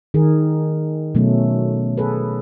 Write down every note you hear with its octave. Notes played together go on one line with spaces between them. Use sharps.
D#3 G#4 A#4
B2 F#3 A3 C#4
G#4 A4 B4